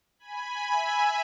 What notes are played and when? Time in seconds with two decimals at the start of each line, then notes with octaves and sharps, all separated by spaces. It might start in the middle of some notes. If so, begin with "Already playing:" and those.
0.19 G#5 B5
0.66 E5 G#5